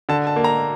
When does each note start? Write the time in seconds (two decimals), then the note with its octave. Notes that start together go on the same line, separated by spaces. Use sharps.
0.09 D3 A5
0.27 A5
0.36 A#3
0.44 A#5